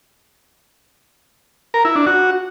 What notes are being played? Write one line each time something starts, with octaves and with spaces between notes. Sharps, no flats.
A#4
E4
D4
F#4